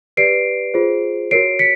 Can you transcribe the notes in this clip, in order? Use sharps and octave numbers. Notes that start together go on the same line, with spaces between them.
G4 B4 D5 C7 D7
F4 G#4 C5
F#4 A#4 C#5 C7 D7
B6 C#7